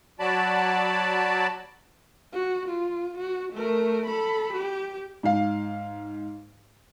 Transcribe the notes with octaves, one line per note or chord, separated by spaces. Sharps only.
F#3 F#4 D5 A5 B5
F#4
F4
F#4
A3 A#4
A4 B5
G4
G#2 F5